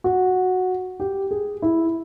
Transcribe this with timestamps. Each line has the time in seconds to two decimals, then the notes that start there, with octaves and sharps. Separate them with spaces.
0.04 F#4
1.00 G4
1.31 G#4
1.62 E4